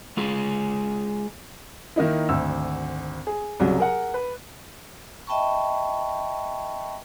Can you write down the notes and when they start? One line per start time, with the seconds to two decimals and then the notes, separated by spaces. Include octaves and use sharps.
0.17 G#3 F4 G#4
1.96 D#3 A#3 D#4 E4
2.29 G#1 D2 E6
3.27 G#4
3.60 C2 C#3 F#3
3.78 G#4 A#4 F#5
4.14 B4
5.27 D#5 E5 G5 A5 B5 C#6